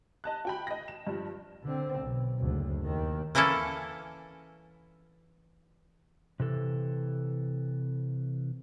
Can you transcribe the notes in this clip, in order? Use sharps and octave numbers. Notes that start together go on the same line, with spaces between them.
D#5 A5 F#6
F#4 G5 B5
D#5 A#6
E7
G2 F3
D3 C4
B1
F#1 D2
D#2 D#3
E3 A#3 C#4 E4 A4
C3 E3 A4